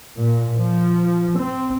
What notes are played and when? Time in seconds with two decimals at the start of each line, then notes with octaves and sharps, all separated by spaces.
0.16 A#2
0.56 F3
1.39 C4